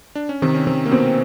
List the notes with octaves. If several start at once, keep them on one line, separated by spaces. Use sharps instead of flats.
D4
C#4
C3 D#3 C4
C#4
C3 D#3 C4
A#3
B2 B3 C4